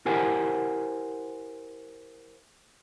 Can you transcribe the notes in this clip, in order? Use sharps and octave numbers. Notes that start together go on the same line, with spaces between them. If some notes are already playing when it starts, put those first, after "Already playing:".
E4 G4 A#4 C5 F#5 G#5